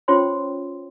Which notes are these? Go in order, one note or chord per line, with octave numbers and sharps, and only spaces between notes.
C#4 F4 C5 C#5 G5 C6